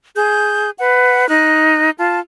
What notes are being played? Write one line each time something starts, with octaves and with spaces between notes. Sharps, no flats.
G#4 G6
B4 F#5
D#4 F#6
F4 A5